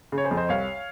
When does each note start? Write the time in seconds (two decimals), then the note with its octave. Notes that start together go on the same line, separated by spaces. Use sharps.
0.12 C#3
0.18 C#5
0.24 G#4 C5
0.31 F2
0.37 C5 D#5
0.49 C2 C#5 F5